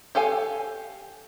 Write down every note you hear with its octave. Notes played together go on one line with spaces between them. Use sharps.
G4 A4 F5 G#5